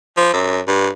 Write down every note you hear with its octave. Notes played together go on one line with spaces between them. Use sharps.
F3
F#2
G2